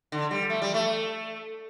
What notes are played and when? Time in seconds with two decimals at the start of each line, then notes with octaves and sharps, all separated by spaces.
0.12 D3
0.31 G3
0.50 A3
0.62 G3
0.74 A3